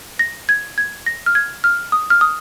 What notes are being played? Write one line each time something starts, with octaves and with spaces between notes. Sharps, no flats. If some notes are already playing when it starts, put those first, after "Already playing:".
A#6
G#6
G#6
A#6
F6
G#6
F6
D#6
F6
D#6